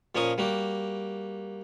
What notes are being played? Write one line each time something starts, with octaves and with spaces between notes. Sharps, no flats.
A#2 F3 C#4 A#4 C#6 D#6
G3 A#3 F#4 G4